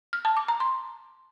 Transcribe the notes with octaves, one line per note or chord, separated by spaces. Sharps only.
F6
A5
D6
A#5
C6